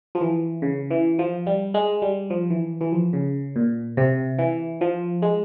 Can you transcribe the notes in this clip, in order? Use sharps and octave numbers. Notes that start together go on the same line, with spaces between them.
F3
E3
C#3
E3
F3
G3
G#3
G3
F3
E3
E3
F3
C#3
A#2
C3
E3
F3
G#3